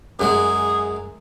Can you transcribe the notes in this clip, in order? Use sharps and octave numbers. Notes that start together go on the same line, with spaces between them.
F#2 F#3 G#3 G#4